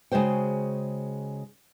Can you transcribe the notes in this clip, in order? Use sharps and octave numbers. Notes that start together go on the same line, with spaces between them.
C#3 G#3 F#4 C5 G5